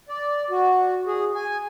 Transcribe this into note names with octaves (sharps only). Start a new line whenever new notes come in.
D5
F#4
G#4
G#5